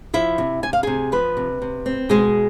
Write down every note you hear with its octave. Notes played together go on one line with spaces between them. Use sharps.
F3 E4 E5
C3
C3 G#5
F5
C3 G#4 G#5
F3 B3 B4
C3
C3
C4
B2 G#3 G#4